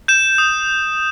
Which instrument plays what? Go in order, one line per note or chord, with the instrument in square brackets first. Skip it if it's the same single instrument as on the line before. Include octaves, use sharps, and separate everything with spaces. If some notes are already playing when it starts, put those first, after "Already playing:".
[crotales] G6 E7
D#6